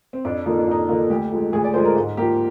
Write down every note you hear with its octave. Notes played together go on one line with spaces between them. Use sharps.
C4
F2 D4
D3 F3 A#3 D#4
D4
F2 D#4
D3 F3 A#3
D2 G4
D3 F3 G#3
D2 G#4
D5
D3 F3 G#3 C5
A#4
G#2
F3 A#3 G4